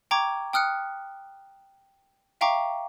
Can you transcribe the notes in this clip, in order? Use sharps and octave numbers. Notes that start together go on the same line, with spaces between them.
G5 A#5 C#6 D6 G#6
G5 D#6 F6 F#6 C#7
E5 F5 G5 A#5 C#6 D6